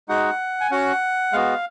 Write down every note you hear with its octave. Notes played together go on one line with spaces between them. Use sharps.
G#3 D#4 F#4 F#5
G#5
C#4 F#4 F#5
G#3 B3 F#4 F5